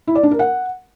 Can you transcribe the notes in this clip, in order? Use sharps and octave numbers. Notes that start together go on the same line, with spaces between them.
E4
D5
D4
A#4
F#5